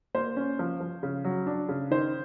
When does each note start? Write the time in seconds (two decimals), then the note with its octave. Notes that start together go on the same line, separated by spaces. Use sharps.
0.15 A#3 C5
0.37 C#4
0.59 F3
0.81 F3
1.03 C#3
1.24 F#3
1.47 D4
1.69 C#3
1.91 D#3 C5